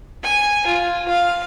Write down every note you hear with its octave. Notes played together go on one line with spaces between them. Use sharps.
G#5
F4
F5